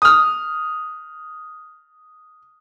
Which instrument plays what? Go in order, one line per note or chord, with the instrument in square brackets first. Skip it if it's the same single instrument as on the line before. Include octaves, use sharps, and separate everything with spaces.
[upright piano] D#6 F6